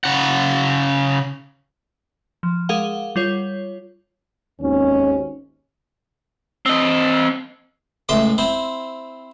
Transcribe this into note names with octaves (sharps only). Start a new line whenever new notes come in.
C#3 F#5
F3
G#3 G#4 A#4 F5 F#5 G7
G3 F4 C#5
G#1 D#2 C#4
C4 D#5
C#2 A2 E5 C6 D6
C4 E4 C5